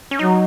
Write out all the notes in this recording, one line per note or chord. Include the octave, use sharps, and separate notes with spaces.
C#4
F#3 D#4